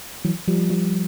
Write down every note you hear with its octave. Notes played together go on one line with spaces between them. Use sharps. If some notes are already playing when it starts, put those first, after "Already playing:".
E3 F#3
F3 G3
F3 G3